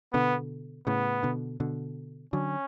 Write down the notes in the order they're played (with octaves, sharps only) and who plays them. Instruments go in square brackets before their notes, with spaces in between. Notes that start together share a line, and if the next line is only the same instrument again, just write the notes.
[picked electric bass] B2 D3 [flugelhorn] B3
[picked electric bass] A2 C#3 [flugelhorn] B3
[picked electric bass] B2 D3
B2 D3
[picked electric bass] D3 F#3 [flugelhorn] C#4